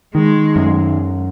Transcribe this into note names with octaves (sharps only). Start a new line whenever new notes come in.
D#3 G#3
F#2